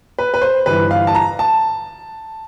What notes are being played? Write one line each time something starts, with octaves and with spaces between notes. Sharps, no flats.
B4
B4
C5
G1 G2 E3 B4
F5
A5
A#5
A5